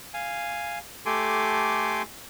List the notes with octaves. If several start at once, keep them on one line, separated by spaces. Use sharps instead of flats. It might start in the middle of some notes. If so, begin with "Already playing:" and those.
F5 G#5
A3 G4 A4 G#5 C6 D6